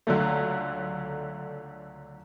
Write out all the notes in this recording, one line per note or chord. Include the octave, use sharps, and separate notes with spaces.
C#2 D3 F#3 A3